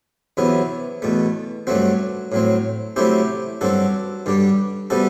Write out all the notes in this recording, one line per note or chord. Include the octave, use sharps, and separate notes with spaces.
E2 C3 F#3 B3 E4
E2 B2 A3
G2 F#3 A3 C4 F#4
A2 F#3 C4
C3 F#3 A3 C4 E4 G4
G2 F#3 C4 F#4 A4
G2 D3 G3 D4
C3 G3 B3 F#4 A4